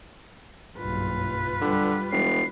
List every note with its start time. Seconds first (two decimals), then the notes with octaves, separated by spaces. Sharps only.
0.78 F#1 B1 G2 F4 B4
1.61 D3 G3
2.12 E1 C7